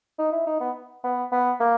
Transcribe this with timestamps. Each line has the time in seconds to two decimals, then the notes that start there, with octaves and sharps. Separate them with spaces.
0.18 D#4
0.32 E4
0.46 D#4
0.60 B3
1.04 B3
1.32 B3
1.60 A#3